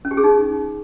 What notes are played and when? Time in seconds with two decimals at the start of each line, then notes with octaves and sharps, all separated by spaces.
0.05 C#4
0.11 G4
0.17 G#4
0.24 D#4